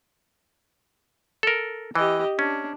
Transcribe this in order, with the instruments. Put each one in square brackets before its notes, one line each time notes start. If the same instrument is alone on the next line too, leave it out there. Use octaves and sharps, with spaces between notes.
[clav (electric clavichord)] A4 A#4
[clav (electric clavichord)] E3 [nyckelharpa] G4 D#5
[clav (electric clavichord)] C#4 [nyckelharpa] D4